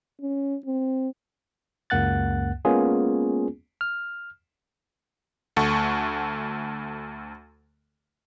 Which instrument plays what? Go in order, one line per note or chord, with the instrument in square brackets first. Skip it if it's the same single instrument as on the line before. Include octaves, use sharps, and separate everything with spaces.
[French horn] C#4
C4
[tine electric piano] C#2 F#2 A#3 F#5 F#6 A6
G#3 A#3 B3 C#4 F4 G#4
F6
[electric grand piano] D2 A3 F#5 A5 C#6